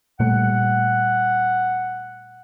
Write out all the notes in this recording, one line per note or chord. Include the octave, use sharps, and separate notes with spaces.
A#2 G3 A3 F#5